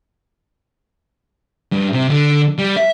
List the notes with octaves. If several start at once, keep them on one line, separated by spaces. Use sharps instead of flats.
G2
C3
D3
G3
E5